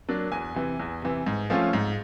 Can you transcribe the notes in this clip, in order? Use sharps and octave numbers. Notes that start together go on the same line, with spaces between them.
F#3 A#3 D4
E2 G#5
C3 E3
E2
C3 E3
G#2
F3 A3 C#4 F4
G#2